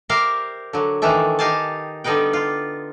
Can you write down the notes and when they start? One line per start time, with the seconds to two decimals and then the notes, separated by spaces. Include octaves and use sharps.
0.09 G4 A#4 C5 D5 E5 F5
0.73 D3 F#3
1.02 D#3 E3 A3 D4 E5
1.39 D#4 G4 F5 G#5 A5
2.04 D3 G3 B3 D#4 B4 G5
2.33 F4